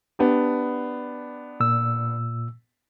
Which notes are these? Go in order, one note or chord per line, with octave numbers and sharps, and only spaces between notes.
B3 D4 G4
A#2 E6